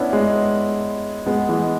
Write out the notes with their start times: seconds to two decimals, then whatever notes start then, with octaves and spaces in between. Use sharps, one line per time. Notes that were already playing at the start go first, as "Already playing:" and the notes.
Already playing: B3 C#4 D4 E4
0.13 G#3 B3
1.26 G#3 B3
1.49 E3 G#3